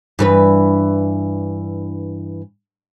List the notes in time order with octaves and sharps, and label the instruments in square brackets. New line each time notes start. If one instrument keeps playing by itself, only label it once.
[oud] G2 E3 B4